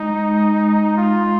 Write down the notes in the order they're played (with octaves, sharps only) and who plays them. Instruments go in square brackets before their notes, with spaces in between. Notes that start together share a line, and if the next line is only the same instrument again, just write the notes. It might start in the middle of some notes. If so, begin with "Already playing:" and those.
Already playing: [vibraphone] G#3 [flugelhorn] D#4
[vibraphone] G#3
G#3
[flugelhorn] F4